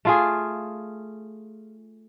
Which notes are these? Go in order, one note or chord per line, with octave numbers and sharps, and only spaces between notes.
A3 F4 G#4